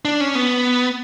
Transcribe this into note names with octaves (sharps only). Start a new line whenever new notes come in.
D4
C#4
B3